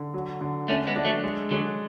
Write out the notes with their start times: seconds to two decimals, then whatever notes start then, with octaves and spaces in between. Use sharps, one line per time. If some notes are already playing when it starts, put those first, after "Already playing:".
Already playing: D3
0.14 F#3
0.41 D3
0.68 A3 C#4 D4
0.87 G#3 B3
0.96 D4
1.05 F#3 A3
1.23 G#3
1.51 D3 F#3 G#3